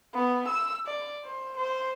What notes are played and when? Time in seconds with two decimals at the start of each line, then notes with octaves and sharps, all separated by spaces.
0.14 B3
0.48 E6
0.87 D5
1.25 C5
1.57 C5